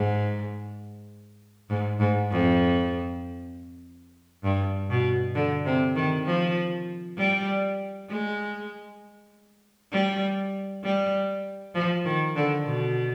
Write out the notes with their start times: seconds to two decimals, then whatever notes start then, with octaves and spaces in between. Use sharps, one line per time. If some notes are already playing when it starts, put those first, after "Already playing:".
Already playing: G#2
1.70 G#2
2.00 G#2
2.31 F2
4.43 G2
4.90 B2
5.35 D3
5.66 C3
5.95 D#3
6.26 F3
7.18 G3
8.09 G#3
9.92 G3
10.84 G3
11.75 F3
12.05 D#3
12.36 D3
12.66 B2